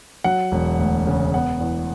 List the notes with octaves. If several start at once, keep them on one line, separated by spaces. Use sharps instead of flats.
F#3 F#5
E1
D2
C#3
B3 F#5
E2